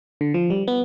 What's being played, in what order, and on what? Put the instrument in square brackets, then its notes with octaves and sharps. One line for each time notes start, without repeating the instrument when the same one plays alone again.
[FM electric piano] D3
F3
G3
B3